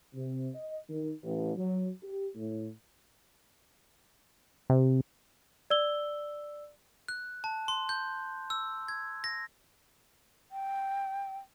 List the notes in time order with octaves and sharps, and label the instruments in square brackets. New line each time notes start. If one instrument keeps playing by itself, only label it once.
[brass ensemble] C3
D#5
D#3
A1
F#3
G4
A2
[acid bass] C3
[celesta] D5 E6 G7
[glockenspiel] F#6
A5
C6
G6
E6
G#6
A#6
[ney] G5